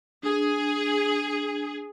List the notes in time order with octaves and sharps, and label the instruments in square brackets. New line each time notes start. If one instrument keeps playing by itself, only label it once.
[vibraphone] D4 [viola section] G#4